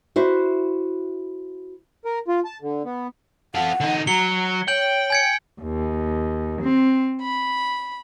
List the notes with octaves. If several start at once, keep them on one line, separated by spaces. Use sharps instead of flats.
E4 F#4 C5
A#4
F4
A5
D3
B3
F4 A4 F#5
D3 D#4
F#3 A#5 C#7 G7
C#5 G5 G6 F#7
G#5 G#6 C#7
D#2
C4
B5